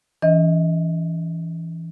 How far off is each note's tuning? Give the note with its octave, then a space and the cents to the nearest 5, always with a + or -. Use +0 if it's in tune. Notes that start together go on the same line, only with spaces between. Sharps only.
E3 +0 C#4 +25 D#5 +20